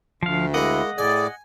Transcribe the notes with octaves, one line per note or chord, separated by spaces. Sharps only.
D2 F3 F5
G#3 A#3 E4 D#5 F#5
A2 G#4 D5 G#5